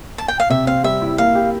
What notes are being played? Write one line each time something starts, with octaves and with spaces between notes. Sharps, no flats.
A5
G5
F5
C3 E5
C4 F5
G3 E5
E4
A#3 F5
G4